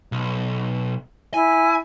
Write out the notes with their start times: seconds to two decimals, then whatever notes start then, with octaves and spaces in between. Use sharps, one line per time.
0.12 B1
1.34 E4 G#5